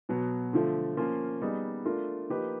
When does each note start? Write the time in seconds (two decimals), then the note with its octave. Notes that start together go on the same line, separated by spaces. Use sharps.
0.09 B2 F#3 B3
0.53 D3 F3 A3
0.97 F3 A#3 C#4 F4
1.41 G3 B3 D#4 G#4
1.85 A3 D4 F4 A#4
2.30 F3 A#3 D#4 G4 B4